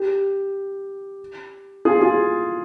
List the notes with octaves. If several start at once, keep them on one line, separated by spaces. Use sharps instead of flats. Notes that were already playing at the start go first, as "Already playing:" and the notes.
Already playing: G4
F4 G#4
F4 G#4